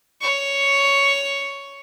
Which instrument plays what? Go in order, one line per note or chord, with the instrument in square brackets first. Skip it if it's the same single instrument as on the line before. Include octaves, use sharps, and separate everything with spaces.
[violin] C#5 C#6